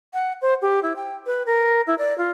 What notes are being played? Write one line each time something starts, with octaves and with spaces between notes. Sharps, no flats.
F#5
C5
G4
E4
G5
B4
A#4
E4
D5
F4